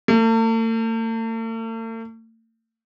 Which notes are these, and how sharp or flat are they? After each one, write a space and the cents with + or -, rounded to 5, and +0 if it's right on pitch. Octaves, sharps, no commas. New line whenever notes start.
A3 +45